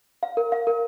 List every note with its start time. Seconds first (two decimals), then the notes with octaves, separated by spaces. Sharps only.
0.23 F5
0.37 A#4
0.52 F5
0.67 A#4